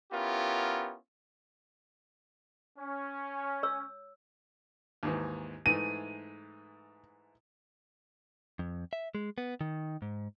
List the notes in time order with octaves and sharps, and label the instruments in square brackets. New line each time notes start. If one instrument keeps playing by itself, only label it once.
[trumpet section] B3 C#4 E4 F4 G4 A#4
C#4
[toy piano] C#5 E6
[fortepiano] D#2 G#2 E3
[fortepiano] G#2 E3 A3 [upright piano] D#7
[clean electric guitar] F2
E5
G#3
B3
D#3
G#2